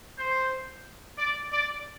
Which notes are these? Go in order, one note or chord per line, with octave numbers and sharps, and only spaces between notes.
C5
D5
D5